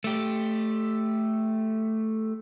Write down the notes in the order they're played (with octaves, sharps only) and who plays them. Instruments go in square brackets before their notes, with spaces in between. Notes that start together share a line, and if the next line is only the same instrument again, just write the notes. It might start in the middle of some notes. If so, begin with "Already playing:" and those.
[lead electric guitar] A3 G4